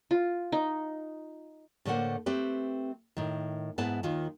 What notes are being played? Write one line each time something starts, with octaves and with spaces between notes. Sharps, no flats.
F4
D#4
A2 D3 A3 A#3 C5 F#5
A3 C4 G4 B4
A2 D#3
G#2 B3 E4 A5
D#2 D#3 F4